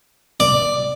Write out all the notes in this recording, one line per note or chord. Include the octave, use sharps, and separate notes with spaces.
D5